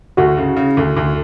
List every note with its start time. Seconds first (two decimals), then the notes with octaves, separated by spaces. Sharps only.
0.17 D2 F#4
0.37 C#3
0.57 C#3
0.77 D2
0.97 D2